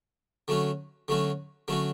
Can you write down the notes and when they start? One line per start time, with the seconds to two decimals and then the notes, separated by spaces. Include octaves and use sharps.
0.48 D3 F#3 A3 C#4 F#4
1.08 D3 F#3 A3 C#4 F#4
1.68 D3 F#3 A3 C#4 F#4